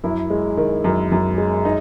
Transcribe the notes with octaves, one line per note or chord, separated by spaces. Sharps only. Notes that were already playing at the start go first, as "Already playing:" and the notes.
F#2 E4
G#3
D#3
F#2
F#2
G#3
D#4